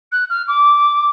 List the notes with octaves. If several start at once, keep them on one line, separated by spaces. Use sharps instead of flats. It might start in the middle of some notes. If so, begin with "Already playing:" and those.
F#6
F6
D6